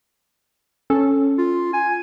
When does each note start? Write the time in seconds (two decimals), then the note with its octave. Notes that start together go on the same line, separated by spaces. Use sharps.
0.90 C#4 A4
1.38 F4
1.73 G#5